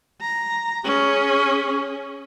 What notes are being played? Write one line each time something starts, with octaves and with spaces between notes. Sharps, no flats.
A#5
C#4 G#4